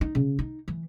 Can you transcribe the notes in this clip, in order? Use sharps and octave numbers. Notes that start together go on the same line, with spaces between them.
D#4
C#3
D#4
E3